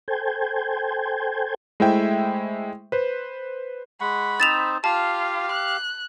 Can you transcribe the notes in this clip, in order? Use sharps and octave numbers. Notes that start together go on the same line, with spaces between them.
A4 C5 G5 G#5
G#3 A3 E4 C5 E5 G5
B4 C5
G#3 F#5 B5 C#6
C4 D#4 C5 A6 E7 F7
F4 G4 F5 A5
F#6